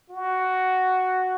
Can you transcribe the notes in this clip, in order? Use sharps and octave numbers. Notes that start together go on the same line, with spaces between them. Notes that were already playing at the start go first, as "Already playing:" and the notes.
F#4